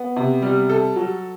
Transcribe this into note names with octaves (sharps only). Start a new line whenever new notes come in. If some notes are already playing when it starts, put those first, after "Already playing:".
Already playing: B3
C3
G3
A4
F#3